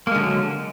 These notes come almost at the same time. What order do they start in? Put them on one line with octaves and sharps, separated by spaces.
A#3 G#3 D3 F#3